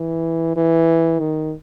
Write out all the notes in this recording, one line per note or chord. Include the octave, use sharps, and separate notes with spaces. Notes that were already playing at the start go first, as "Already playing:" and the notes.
Already playing: E3
E3
D#3